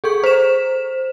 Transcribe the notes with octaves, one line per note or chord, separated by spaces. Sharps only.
G#4 A4 C#6
C5 E7